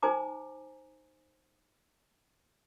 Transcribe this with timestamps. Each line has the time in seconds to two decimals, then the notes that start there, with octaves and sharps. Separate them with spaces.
0.02 D#4 C5 G#5 A#5 D6